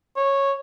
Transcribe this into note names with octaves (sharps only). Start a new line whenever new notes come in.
C#5